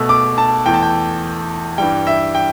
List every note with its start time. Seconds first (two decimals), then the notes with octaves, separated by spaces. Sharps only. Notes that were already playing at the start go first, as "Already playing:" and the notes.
Already playing: B2 A3 E6
0.09 D6
0.38 A5
0.66 E2 E3 A3 G5
0.74 A5
0.83 G5
1.78 G2 E3 G3 G5
2.07 E5
2.35 G5